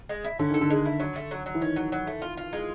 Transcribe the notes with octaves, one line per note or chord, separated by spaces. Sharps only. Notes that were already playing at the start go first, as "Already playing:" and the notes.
G#3
E4
D3 C#4
D#3 A4
D3
G#3
E4
F#3
A3
F#3
F#3
E3
D#3 C#4
F#3
F#3
A3
F4
F4
G#3